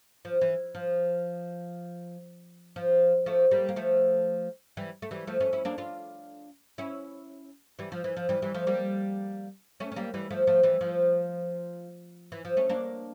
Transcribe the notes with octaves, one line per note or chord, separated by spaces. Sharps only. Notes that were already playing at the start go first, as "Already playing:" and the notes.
F3
E3
F3
F3
F3 A3
G3 A#3
A#3
F3 A3
E3 G3
A3
E3 G3
F3 A3
A3 C#4
C#4 E4
A#3 D4
D4 F4
C#4 E4
E3 G3
F3
E3
F3
E3 G3
E3 G3
F3 A3
G3 A#3
A3 C#4
C#4
G3 A#3
E3 G3
F3 A3
F3 A3
E3 G3
F3
E3
F3
A3 C#4
A#3 D4